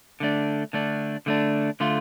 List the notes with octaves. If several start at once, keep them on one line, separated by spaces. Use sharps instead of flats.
D3 A3 D4
D3 A3 D4
D3 A3 D4
D3 A3 F4